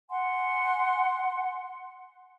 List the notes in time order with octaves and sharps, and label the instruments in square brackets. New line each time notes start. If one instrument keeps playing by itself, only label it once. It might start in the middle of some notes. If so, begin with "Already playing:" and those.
[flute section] F#5 G#5 C6